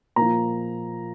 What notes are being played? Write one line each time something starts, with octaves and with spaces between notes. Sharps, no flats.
A#2 F3 A#5